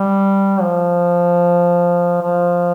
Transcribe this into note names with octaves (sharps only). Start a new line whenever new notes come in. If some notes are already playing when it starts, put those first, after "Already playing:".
Already playing: G3
F3
F3